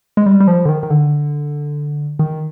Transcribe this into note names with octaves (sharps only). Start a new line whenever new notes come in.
G#3
G3
G3
F3
D3
D#3
D#3
D3
D#3